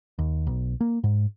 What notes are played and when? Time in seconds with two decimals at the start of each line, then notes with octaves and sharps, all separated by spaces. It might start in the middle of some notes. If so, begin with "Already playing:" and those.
0.19 D#2
0.47 B1
0.81 A#3
1.04 G#2